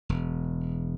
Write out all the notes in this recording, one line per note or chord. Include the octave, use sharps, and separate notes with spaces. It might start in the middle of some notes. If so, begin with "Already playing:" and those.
E1